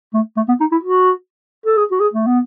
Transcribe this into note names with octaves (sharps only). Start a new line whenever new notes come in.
A3
A3
B3
D#4
E4
F#4
A4
G#4
F#4
G#4
A3
B3